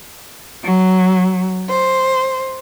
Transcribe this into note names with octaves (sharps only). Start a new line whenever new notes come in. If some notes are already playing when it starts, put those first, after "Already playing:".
F#3
C5